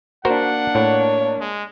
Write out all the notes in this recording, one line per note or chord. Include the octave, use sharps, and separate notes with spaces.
A#3 D4 F#4 A#4 C5 F#5
A2 C#5
G#3